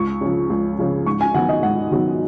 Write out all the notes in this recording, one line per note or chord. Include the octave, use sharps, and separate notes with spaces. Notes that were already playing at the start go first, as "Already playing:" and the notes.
Already playing: C#2 C#6
C#3 F3
C#2
C#3 F3
G#2 C#6
G#5
D#3 F#3 B3 F#5
D#5
G#2 F#5
D#3 F#3 B3